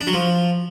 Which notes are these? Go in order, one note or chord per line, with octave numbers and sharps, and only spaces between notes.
D4
F#3
F3